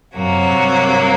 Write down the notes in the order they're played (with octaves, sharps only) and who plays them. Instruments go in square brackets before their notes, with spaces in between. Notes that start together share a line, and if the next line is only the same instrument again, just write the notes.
[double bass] F#2 [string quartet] C3 F#3 A#3 F#4
[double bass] G2